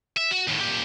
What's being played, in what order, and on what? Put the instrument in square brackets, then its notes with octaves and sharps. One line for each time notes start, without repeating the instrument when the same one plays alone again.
[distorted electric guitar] E5
F#4
D#2 A2
A#2 G4